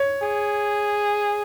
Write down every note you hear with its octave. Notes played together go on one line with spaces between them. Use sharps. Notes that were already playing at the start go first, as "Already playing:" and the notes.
Already playing: C#5
G#4